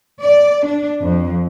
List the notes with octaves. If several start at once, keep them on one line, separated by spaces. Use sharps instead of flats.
D5
D4
F2